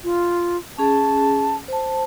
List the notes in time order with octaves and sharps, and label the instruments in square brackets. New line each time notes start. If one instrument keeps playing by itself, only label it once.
[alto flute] F4
[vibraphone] C#4 G#4 [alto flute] A5
[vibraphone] C5 A5